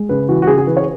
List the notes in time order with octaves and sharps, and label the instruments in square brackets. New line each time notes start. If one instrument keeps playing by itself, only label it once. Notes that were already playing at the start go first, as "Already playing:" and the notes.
Already playing: [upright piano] G#3
C#3 B4
E3 F#4
F#4
C#3 G#4
G#4
E3 B4
C#5